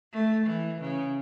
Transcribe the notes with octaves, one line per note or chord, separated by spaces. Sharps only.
A3
E3
C#3